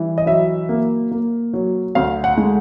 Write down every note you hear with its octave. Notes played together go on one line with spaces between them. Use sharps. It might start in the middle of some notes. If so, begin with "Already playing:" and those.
Already playing: E3 G3
D#5
F#3 E5
A#3
A#3
F#3
D2 F5
F#5
G#3